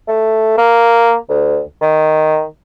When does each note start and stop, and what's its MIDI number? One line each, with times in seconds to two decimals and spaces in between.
0.08 0.54 57
0.58 1.14 58
1.29 1.60 38
1.81 2.44 51